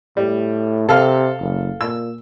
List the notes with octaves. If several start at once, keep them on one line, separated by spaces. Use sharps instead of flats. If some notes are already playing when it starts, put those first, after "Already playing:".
A2 G3
C3 A4 F5 F6
F#1
A#2 E6